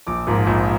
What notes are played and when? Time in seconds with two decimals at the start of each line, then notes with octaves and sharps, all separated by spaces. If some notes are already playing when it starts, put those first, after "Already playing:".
0.07 A#1 D6
0.27 G#2 F3 A#3
0.47 A#1